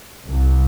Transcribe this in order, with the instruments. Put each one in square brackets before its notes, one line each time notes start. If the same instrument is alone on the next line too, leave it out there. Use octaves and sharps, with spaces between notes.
[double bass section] C2